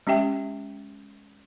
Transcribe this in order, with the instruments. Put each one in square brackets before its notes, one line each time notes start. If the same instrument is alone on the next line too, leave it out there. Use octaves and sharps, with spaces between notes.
[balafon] G#3 C#4 G4 E5 G5